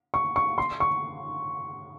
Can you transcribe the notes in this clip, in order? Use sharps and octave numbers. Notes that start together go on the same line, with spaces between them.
C#6
C#6
C6
C#6